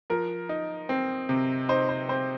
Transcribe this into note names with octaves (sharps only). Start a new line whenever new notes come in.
F3 A#4
D#4
C4
C3
D#4 C5
C5
C4 C5